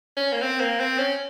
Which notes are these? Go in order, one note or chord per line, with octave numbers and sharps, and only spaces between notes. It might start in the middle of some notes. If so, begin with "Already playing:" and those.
C#4
A#3
C4
A#3
C4
C#4